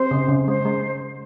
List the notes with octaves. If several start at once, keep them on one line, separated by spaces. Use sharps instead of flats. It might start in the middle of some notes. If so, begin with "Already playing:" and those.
Already playing: C4 C5
C#3
C#3
G#3 C5
G#3